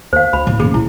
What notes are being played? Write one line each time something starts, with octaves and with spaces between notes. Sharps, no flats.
D#2 C5 F5
D2 B5
A2
F#2 A3 G#4
A#2 E4